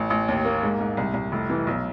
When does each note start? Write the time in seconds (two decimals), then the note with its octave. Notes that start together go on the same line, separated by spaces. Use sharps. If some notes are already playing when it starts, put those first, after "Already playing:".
Already playing: A1
0.10 A1
0.28 D#2
0.45 A#3
0.63 G#2
0.81 G#2
0.97 C2
1.14 C2
1.32 F1
1.50 E3
1.67 B1